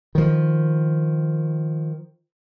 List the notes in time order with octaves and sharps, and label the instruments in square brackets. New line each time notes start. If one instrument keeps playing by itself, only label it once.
[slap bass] D#3 F3